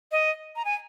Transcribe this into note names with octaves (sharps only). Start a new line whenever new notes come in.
D#5
A#5
G#5